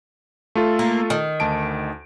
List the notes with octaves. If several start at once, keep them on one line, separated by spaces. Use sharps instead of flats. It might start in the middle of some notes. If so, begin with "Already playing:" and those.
A3 F4 A4
A#3
D#3
D2 A5 D7